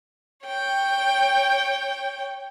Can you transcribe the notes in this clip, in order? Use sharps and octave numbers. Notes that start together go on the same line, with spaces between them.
C#5 G5